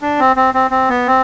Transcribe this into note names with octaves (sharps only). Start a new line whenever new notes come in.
D4
C4
C4
C4
C4
B3
C4